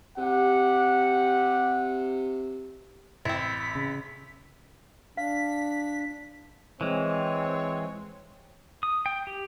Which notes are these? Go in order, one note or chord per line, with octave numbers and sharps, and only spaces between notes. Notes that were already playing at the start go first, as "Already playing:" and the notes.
C3 G4 F#5
A1 C4 E4 B6
C#3
D4 F5 B6
E3 G#3 C4 C#5
D#6
G5
G4